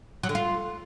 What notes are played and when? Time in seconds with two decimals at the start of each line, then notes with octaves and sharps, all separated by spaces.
0.23 F#3
0.29 D3
0.35 F4